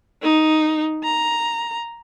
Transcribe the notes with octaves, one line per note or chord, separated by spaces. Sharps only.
D#4
A#5